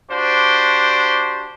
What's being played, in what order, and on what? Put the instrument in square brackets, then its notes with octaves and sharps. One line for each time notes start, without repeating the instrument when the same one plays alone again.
[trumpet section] D4 F#4 G4 C5